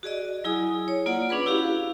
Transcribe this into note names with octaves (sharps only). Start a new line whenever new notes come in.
F#4 G#4 D5 D#5
F#3 E4 G#4 G#5 D#6
C#5
A#3 F4 D5 F#5
C#4 D4 G#4 B4 B5
E4 F#4 G4 F5